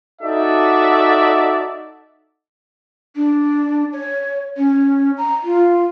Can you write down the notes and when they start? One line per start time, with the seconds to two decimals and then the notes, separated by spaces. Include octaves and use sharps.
0.22 D#4 F#4 A4 D5 E5
3.16 D4
3.93 C#5
4.57 C#4
5.18 A#5
5.44 F4